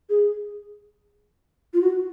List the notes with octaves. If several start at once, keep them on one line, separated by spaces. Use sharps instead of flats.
G#4
F4
F#4